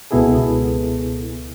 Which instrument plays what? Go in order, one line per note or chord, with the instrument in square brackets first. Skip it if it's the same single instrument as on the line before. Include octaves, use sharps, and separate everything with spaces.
[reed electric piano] C#2 B2 B3 E4 G#4 A4